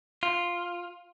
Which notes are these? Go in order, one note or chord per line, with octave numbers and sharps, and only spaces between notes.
F4